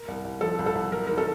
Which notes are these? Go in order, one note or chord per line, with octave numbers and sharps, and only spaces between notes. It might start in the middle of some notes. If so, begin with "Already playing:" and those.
Already playing: A#4
C2
C2
F3 A4
C2
A4
C2
F#3 A#4
D#3 A#4
A4